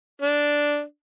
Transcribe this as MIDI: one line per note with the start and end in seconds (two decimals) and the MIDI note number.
0.22 0.82 62